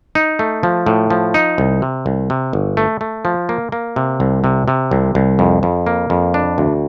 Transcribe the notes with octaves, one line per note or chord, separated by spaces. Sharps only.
D#4
A3
F3
A2
F3
D#4
C2
C3
C2
C3
G1
A3
A3
F3
A#3
A#3
C3
C2
C3
C3
C2
C2
F2
F2
A#3
F2
D4
D2